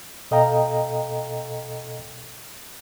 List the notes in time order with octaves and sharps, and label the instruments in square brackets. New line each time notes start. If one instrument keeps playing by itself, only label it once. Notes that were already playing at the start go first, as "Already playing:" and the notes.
[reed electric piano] B2 A4 D#5 F5 G5 A#5